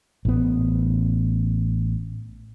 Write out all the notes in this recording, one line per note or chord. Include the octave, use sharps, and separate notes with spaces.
A1 B3